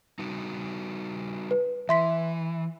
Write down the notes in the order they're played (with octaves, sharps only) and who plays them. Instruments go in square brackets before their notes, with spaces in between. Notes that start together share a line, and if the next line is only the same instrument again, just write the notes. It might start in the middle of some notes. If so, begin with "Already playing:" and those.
[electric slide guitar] G3 D#4 F#4
[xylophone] B4
[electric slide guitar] E3 [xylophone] E5 C6 B6